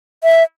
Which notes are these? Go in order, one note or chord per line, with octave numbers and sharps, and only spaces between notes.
E5